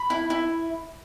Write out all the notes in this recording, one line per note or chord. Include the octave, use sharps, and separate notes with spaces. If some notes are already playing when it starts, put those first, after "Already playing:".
Already playing: B5
E4
E4